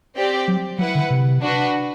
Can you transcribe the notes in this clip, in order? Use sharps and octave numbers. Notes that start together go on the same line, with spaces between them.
C4 G4 D5 G5
F#3
F#3 E4 B4 F#5
D3
C3
D4 F#4 B4